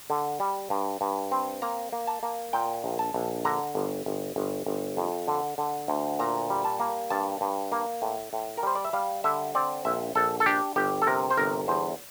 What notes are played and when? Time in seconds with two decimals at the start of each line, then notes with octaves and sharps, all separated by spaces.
0.10 D3
0.40 G3
0.70 G2
1.01 G2
1.32 C4
1.62 A#3 A#5
1.92 A#3
2.07 A5
2.23 A#3
2.53 A#2 G5
2.84 A#1
2.99 A5
3.14 A#1
3.45 D3 A#5
3.75 G1
4.06 G1
4.36 G1
4.66 G1
4.97 F2
5.28 D3
5.58 D3
5.88 D2
6.19 A#2 A#5
6.50 G3
6.65 A5
6.80 A#3
7.10 G2 A5
7.41 G2
7.72 A#3
8.02 A2
8.33 A2
8.57 A#4
8.63 G3 C5
8.75 D5
8.85 E5
8.93 G3 F5
9.24 D3 E5
9.55 C4 D5
9.85 A#1 E5
10.15 A#1 A4
10.40 A4
10.46 D4 G4
10.76 G1 G4
11.02 A4
11.07 C3 A#4
11.30 C5
11.37 G1 A#4
11.68 E2 C5